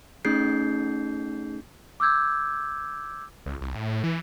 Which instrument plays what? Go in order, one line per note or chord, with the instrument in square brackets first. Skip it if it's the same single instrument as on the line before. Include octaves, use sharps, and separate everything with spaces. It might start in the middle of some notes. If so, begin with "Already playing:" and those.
[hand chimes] A3 C#4 D#4 G#4 G6 C7
[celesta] D6 E6 G6 G#6
[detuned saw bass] C#2
C2
A2
E3